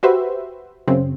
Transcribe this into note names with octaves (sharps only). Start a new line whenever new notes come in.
F#4 G4 B4 C5 E5
F#2 C#3 C4